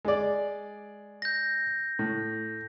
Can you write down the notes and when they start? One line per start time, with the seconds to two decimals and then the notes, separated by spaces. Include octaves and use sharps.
0.05 G#3 D5
1.22 G6 A#6
1.99 A2